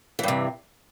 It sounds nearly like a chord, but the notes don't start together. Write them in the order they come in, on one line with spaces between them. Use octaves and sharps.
E3 G2 C3